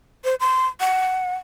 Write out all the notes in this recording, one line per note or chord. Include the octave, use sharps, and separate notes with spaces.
C5
C6
F#5